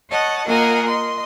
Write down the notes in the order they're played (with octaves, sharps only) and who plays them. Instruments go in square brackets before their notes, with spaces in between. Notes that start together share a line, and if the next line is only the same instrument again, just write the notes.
[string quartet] C#5 D#5 F#5 A5
A#3 F4 A#4 D#5 F#5 G#5
D#5 C6